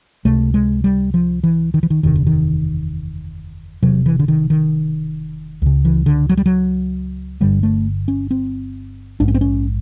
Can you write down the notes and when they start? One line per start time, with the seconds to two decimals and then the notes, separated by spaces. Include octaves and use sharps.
0.25 C#2 C3 A3
0.54 G#3
0.84 G3
1.14 F3
1.44 E3
1.74 D#3
1.83 E3
1.90 D#3
2.03 F#1 E2 C3 D#3
2.16 D3
2.27 D#3
3.83 E1 E2 C3 F#3
4.06 E3
4.19 D3
4.28 D#3
4.50 D#3
5.62 C#2 C#3
5.85 E3
6.06 D3
6.30 F#3
6.37 G3
6.46 F#3
7.41 G1 G2 D3 G3
7.63 A3
8.08 C#4
8.31 C4
9.20 A#1 G#2 D4
9.28 C#4
9.35 C4
9.41 C#4